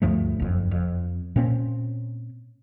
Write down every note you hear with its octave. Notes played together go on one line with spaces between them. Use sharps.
D2 G2 F3 A3
F#1 F2
F2
A#2 A#3 C4 C#4